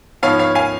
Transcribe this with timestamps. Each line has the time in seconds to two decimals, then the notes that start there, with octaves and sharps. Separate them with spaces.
0.23 G#2 F3 B3 C#5 F5
0.39 C#5 F5
0.55 F5 G#5